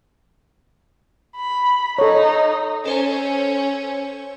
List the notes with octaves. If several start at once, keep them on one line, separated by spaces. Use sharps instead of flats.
B5
D#4 A4 C#5
C#4 A4 C5 C#5